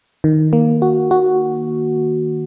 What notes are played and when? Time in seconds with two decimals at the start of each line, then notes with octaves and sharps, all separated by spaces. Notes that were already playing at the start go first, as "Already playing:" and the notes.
0.24 D#3
0.53 A#3
0.82 F#4
1.11 F#4